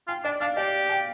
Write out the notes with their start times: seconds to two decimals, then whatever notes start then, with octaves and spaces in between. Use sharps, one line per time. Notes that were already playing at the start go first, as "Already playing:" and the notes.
0.08 F4 G5
0.24 D4 D5
0.41 D4 F5
0.57 G4 D5
0.90 G5